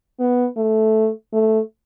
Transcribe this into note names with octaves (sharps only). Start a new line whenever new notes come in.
B3
A3
A3